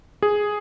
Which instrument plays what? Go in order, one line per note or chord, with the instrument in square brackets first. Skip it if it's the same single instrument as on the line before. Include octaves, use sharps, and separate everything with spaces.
[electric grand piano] G#4